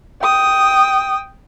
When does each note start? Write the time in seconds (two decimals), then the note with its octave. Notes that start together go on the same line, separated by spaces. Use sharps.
0.22 G5 D#6